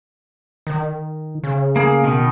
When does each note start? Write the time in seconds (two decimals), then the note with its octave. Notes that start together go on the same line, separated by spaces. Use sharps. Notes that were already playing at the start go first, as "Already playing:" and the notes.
0.67 D#3
1.44 C#3
1.76 A#3 G#4
2.04 B2 D#3